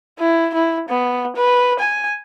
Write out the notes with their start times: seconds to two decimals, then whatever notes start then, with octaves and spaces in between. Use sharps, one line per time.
0.19 E4
0.54 E4
0.88 B3
1.36 B4
1.79 G#5